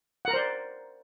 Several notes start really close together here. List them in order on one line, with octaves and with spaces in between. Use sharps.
F#5 A#4 A#5 C5 D5